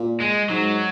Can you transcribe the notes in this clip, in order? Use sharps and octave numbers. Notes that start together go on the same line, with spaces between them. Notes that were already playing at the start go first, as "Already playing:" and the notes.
Already playing: A#2
G#3
G#2 F#3